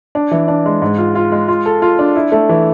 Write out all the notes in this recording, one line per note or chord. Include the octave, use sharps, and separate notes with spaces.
D4
E3
D4
G#3
G#2
F4
F4
G#3
F4
A4
F4
D4
E4
A3
E3